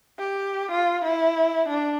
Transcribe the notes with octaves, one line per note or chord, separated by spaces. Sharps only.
G4
F4
E4
D4